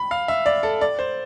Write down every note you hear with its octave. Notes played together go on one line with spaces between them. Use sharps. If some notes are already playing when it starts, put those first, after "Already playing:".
Already playing: B5
F5
E5
D5
A4
D5
C5